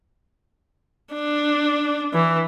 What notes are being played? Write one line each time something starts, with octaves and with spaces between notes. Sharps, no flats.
D4
E3